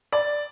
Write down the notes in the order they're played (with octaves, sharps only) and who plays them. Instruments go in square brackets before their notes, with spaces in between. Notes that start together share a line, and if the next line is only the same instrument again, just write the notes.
[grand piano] D5